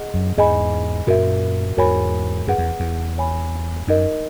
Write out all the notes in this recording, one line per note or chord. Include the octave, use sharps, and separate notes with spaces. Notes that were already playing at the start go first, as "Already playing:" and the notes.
Already playing: G#4 D#5 F#5
F#2
E2 G#2 G#4 D#5 G#5 B5
F#2 A#2 F#4 A#4 E5
E2 G#2 F#4 A#4 C#5 G#5 B5
F#2 G#4 B4 F#5
E2
E2
C#5 G#5 B5
F#2 D#4 A#4 D#5